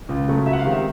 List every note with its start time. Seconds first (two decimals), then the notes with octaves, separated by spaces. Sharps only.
0.09 C#2
0.28 C#3 F#3 A3
0.46 C#2 E5
0.53 F#5
0.59 F5
0.65 C3 D#3 G#3
0.72 E5